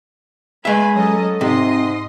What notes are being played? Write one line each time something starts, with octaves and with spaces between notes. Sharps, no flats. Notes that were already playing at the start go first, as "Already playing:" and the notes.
G#3 B4 E5 G#5 B5
F#3 C#4 A4 D#5
G#2 C3 D#5 C6